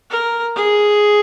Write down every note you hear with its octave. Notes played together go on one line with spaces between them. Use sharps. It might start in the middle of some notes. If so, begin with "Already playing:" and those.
A#4
G#4